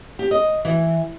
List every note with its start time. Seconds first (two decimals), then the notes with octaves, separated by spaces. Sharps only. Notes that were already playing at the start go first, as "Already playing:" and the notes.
0.19 G4
0.31 D#5
0.65 E3